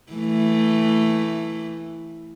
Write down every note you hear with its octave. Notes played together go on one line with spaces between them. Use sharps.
E3 A3